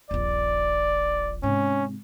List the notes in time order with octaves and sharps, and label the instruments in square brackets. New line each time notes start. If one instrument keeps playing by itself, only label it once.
[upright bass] D#1 A#1 [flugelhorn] D5
[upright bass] G#2 C3 [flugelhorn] C#4